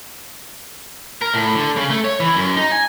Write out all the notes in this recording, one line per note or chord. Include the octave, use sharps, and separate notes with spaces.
A#4
A2
D3
C#3
A3
C#5
E3
F#2
D#4
G#5